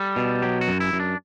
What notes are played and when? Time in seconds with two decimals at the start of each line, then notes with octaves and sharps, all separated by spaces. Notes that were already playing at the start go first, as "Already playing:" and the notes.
Already playing: G3 A4
0.16 B2
0.42 F#3 G4
0.61 F#4
0.68 F#2
0.80 E4
0.93 F#2
0.99 D4